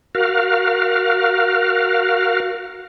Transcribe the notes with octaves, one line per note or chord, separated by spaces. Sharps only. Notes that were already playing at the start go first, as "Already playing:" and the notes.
F#4 A#4 F5